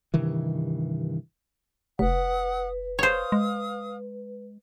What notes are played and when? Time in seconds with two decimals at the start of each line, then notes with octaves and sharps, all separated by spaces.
0.14 G2 C3 D#3 E3
1.99 F1 B4 F#5 D#6
2.99 C5 C#5 F5 D#6
3.32 G#3